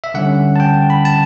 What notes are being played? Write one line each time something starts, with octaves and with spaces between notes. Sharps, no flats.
E5
D3 G3 C#4 F#5
A5
G5
B5
A5